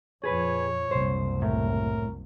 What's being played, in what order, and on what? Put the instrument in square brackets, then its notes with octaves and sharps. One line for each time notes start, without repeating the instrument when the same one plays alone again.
[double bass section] F2 A#2 F3 [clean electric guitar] G#4 B4 [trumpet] C#5
[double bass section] F#1 C2 [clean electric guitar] C5
[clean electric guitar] A2 [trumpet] A#4